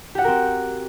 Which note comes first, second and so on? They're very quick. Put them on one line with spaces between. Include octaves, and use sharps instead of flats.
G4 F#5 F#4 A#4 C4